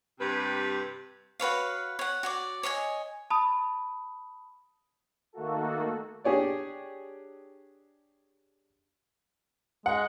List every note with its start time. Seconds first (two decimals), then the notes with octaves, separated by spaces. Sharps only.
0.20 G2 C3 B4
1.40 F#4 B4 C#5 F5
1.99 C#5 F#5
2.23 F#4 C#5 D5
2.63 C#5 D#5 E5 G#5
3.30 A5 B5 D#6
5.33 D#3 A3 A#3 F#4 A4
6.24 D4 G4 G#4 C#5 D5
9.86 G#3 F#5